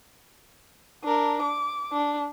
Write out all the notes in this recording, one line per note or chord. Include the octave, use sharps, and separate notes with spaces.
D4 A#4
D6
D4